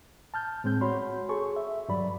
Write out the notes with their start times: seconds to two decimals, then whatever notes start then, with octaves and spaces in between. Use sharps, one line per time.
0.34 A5 F6 G6
0.64 A2 G#3 C4 G6
0.81 F#4 C#5 B5 C6
1.29 G#4 A4 C#6
1.56 E5
1.89 G2 F#3 D5 B5